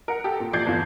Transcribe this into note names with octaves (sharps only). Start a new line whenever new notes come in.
A#4 F#5
G4 A4
A#2
A#1 F3 D5 G6 G#6 C7
G1 E2 F4